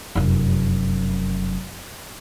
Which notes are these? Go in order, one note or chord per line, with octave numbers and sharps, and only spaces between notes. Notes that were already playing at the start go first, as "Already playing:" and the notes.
F1 F#2